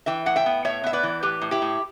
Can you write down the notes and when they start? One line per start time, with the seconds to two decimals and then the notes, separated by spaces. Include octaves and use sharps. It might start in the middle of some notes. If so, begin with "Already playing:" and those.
0.06 E3 E5 G5
0.26 A2 F#5
0.36 E5 G5
0.46 B3
0.65 A2 C#5 E5
0.84 B3 E5
0.93 B4 D5
1.03 E3
1.23 A2 G4 B4
1.42 A2
1.51 E4 G4
1.62 A2